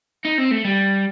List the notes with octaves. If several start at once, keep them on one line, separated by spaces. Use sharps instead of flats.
D#4
C4
A3
G3